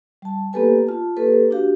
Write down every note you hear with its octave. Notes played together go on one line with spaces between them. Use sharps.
G3 A5
A#3 B3 G4 A4 B4 G#5
F4 A5
A#3 G4 A4 B4
D4 F#4 G4 F5